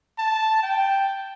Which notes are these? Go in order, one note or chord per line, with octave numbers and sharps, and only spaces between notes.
A5
G5